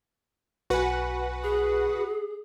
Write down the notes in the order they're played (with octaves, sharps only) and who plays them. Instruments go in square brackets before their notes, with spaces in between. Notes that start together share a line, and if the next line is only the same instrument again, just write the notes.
[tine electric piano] B1 G#5 [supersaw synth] F#4 B4 F#5
[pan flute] G#4